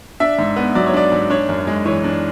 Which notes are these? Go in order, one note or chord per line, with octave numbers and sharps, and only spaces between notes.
D4 E5
G#2
B3
F#3 D5
C#5
D4 D5
G#2
D4 C#5
F#2
G#3
E3 C#5
D4